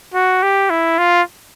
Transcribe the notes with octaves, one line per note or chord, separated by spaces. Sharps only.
F#4
G4
E4
F4